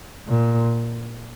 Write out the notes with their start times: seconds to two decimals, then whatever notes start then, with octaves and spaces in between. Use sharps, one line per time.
0.28 A#2